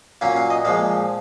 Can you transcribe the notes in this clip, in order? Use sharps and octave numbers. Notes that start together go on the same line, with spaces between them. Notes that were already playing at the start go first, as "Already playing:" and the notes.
A#2 F#3 A#3 C#4 F5
F5
D#5
A#2 F3 G#3 F5